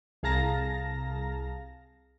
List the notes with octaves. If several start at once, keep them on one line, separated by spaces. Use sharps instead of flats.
C2 G#4 F5 A5 A#5 A#6